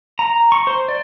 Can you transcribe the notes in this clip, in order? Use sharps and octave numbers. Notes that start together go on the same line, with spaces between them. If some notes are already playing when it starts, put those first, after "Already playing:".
A#5
C#6
C5
D5